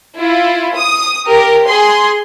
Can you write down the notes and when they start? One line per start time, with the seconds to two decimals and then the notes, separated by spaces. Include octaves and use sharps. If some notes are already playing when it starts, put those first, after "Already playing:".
0.17 E4 F4
0.75 D#6
1.27 G4 A#4
1.67 G#4 C6